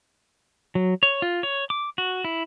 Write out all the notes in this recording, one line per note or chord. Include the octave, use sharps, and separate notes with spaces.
F#3
C#5
F4
C#5
D6
F#4
E4